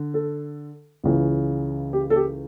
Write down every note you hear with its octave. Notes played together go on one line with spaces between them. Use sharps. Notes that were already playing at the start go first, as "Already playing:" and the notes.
Already playing: D3
A4
C#2 C#3 E3
G4
A4
G4